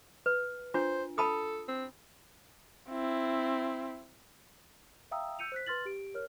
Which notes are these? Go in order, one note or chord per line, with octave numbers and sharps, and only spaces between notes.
B4
D4 F4 C5
A4 A5 B5 D#6
C4
C4 E4
E5 F5 G5 A#5 D#6 E6
E6 G6 C#7 D#7 F7
C5 F#6 B6
B4 C6 F6 A6 F#7
G4 D7
A#4 C#5 F6